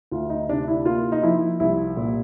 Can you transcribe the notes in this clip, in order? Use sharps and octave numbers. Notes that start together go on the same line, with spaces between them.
D2 F4
D#4
C3 D4
E4
A#3 F4
D#4
F3 E4
C2 E4
A#2